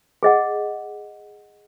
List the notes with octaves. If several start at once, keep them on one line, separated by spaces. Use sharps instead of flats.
G#4 D#5 F#5